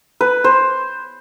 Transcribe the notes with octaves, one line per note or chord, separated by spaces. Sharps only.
B4
C5